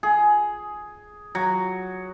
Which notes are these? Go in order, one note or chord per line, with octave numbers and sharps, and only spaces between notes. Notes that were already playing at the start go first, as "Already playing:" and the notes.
G#4
F#3